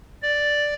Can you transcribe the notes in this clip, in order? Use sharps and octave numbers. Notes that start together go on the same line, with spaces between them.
D5